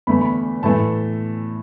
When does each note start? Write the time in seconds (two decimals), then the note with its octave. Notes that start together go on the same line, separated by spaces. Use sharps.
0.07 E2 D3 A3 B5
0.21 B5
0.63 A2 E3 A3 A5